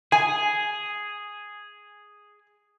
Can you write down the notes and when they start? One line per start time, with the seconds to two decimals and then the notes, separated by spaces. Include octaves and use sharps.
0.12 G#4 G#5